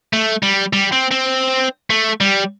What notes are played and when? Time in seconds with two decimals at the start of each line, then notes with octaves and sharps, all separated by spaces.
0.13 A3
0.43 G3
0.73 G3
0.92 C4
1.11 C4
1.90 A3
2.21 G3